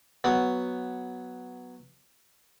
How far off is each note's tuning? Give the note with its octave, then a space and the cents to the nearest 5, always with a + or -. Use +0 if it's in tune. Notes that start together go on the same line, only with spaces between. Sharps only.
F#3 +0 B3 +0